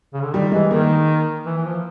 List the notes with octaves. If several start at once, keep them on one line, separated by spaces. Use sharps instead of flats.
C#3
D3
D#3 G3
E3 G#3
D#3 A#3
E3
E3
F3